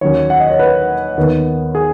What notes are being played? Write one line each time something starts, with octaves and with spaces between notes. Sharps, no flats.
D#2 D#3 F#3 C#4 C#5
F#5
D#5
C#5
B4
D#2 D#3 B3
G#4